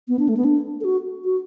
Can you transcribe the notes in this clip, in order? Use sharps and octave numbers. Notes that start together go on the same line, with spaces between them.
B3
D4
A3
B3
D4
A4
F#4
F#4